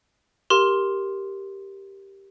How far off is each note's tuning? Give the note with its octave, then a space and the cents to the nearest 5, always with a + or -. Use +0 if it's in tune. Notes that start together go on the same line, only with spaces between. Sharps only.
G4 +0 A#4 +0 C6 +0